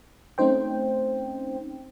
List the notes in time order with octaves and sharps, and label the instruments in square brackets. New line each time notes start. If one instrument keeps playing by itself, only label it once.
[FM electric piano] A3 C4 C#4 D#4 C5 G5